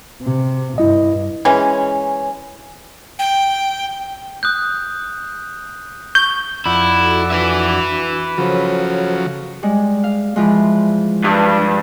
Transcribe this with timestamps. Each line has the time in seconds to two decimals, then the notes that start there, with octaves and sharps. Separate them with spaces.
0.22 C3
0.78 G2 E4 D#5
1.45 E3 G#3 C#4
3.19 G5
4.43 D#6 F#6 G6
6.15 C#6 G6
6.66 F2 E4 D5 F#5
7.00 F#4 A4
7.32 D4 F#4 B4 E5
8.38 C#3 F3 F#3 A4 C5 C#5
9.63 G3 G#3
10.04 F5
10.36 E3 F3 G#3
11.24 G2